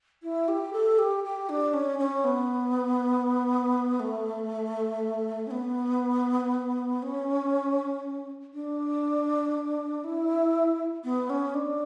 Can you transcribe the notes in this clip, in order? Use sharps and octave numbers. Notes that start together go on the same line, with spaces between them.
E4
G4
A4
G4
G4
D4
C#4
C#4
B3
A3
C#4
B3
C#4
D4
E4
B3
C#4
D4